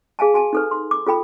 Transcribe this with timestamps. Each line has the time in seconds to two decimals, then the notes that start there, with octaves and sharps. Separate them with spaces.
0.19 G#4 F5 G#5 A5
0.34 F#4 G#5 A5
0.53 D#4 A4 B4
0.71 C6
0.91 D6
1.06 F4 A4 G5 B5